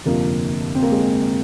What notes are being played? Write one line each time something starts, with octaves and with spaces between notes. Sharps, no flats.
G1 F2 C3 F3 A#3
C4
A#3
G#3